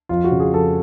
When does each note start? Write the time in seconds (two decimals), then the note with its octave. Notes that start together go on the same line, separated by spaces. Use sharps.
0.09 F2 F4
0.24 F#4
0.31 C#3
0.40 G#4
0.54 F2 A4